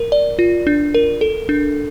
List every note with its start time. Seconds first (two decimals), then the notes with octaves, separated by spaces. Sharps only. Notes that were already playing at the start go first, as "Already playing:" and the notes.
Already playing: A#4
0.12 D5
0.39 F4
0.67 D4
0.94 A#4
1.21 A4
1.49 D4